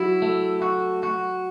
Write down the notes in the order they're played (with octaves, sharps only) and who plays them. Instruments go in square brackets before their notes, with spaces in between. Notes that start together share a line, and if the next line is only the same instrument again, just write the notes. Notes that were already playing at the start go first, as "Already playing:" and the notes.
Already playing: [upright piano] F#3 [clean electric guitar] E4
[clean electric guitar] A3
F#4
F#4